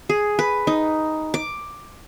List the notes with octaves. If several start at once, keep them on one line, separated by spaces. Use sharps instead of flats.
G#4
B4
D#4
D6